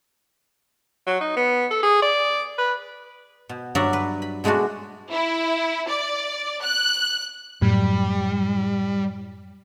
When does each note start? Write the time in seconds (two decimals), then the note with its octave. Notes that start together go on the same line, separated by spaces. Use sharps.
1.07 F#3
1.21 D#4
1.36 B3
1.71 A4
1.83 G#4
2.02 D5
2.58 B4
3.49 B2
3.75 G2 F#3 D5 E5 A#5
3.93 B4
4.22 B5
4.44 B2 G#3 A3 D4 F#4
5.11 E4
5.88 D5
6.62 F#6
7.62 F#2 A2 G3